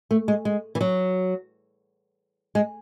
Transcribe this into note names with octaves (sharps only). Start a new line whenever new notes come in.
A3
G#3
G#3
E3
F#3
G#3